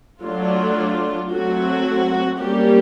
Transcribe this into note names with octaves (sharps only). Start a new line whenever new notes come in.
F#3 A3 D4 F4
F#3 A3 C4 F#4
G3 A#3 C#4 G4